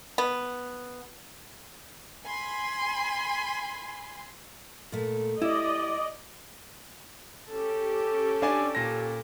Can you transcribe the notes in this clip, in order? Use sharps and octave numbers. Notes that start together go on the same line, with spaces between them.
B3
G#5 B5 C6
A#2 G#3 A3
E4 G4 D5 D#5
C#4 G4 A4
D4 D5 G#5
A#2 A#6